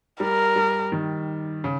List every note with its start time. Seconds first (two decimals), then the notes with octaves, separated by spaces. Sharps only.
0.20 G3 A#4
0.56 G3
0.92 D#3
1.64 C#3